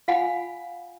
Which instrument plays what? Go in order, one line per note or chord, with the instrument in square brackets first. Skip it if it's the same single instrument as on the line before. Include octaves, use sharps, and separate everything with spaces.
[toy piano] F4 F5 F#5 G#5 B5